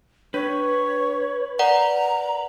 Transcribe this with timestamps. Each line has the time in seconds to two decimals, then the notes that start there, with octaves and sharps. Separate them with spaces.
0.34 D4 B4 C#5
1.59 A#4 D5 F#5 A#5